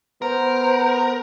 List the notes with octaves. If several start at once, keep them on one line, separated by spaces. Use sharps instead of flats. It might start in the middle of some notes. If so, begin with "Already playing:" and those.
B3 A#4 C5